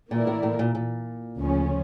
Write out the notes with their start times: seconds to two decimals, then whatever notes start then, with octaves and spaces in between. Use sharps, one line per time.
0.11 A#2 E3 A#3 E4 A#4 D5
0.27 A2
0.43 A2
0.59 A#2
0.75 A#2
1.37 D2 C#3 F3 C#4